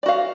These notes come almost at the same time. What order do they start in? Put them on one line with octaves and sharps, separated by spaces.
D5 F#4 F5